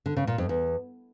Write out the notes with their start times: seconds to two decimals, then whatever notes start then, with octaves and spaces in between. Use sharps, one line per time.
0.06 D3
0.17 C#3
0.27 A#2
0.38 F2
0.49 E2